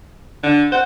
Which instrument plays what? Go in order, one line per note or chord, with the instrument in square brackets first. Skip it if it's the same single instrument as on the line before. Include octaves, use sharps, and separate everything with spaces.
[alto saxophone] D3
[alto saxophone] C5 [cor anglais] F#5